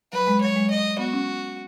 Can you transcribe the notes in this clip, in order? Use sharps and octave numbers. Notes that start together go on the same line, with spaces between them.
F#3 B4
G#3
F#3 C#5
G#3
D#5
B3 F#4
C#4